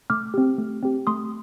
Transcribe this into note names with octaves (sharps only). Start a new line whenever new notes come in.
A3 D6 F6
C4 G4
A3
C4 G4
A3 C6 D#6